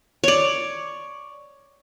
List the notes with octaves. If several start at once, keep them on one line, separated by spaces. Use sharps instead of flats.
C#5 D5